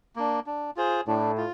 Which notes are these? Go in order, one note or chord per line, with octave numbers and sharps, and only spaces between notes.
A#3 D4
D4
F4 G#4 C5
A2 D4
F4